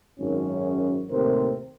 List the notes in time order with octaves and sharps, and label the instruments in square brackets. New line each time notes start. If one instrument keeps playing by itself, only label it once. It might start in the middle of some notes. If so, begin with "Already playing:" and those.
[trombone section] G#1 F#2 C#4
D#2 A2 C3 C4 A#4 C5